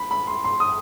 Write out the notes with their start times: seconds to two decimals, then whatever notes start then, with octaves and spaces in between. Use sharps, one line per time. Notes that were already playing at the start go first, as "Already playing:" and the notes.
Already playing: B5
0.11 B5
0.27 C6
0.44 C6
0.60 D#6